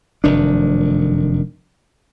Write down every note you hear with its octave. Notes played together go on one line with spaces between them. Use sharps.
F1 F#2 D#3 D4